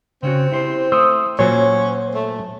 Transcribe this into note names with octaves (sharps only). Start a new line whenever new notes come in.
C#3 C4 C#4 F#4
E4 G4 C5
A3 C5 D#6 E6
A#2 F#3 C#4 F#4 C5 C#5
A3